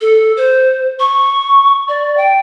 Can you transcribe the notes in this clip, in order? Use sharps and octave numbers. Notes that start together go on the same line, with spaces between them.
A4
C5
C#6
D5
G5